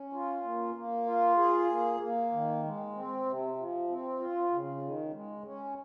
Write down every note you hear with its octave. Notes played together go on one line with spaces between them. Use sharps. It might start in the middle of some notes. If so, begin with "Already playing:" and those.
Already playing: C#4
F4
A#3
A#3
F4
G#4
A#3
A#3
D#3
G#3
C4
C3
F3
C4
F4
C#3
D#3
G#3
C#4